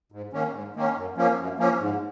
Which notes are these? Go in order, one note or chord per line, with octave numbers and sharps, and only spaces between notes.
G#2
D#3 A#3 C#4
G#2
D#3 A#3 C#4
F#2
F3 A#3 C#4
F#2
F3 A#3 C#4
G#2